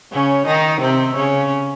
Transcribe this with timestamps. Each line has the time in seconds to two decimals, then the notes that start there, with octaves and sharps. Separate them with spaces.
0.13 C#3 C#4
0.47 D#3 D#4
0.81 C3 C4
1.16 C#3 C#4